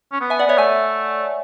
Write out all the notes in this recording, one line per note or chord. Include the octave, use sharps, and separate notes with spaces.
C#4
B3
E5 G#5
D5 F#5
B3 C#5 E5
A3 E5 G#5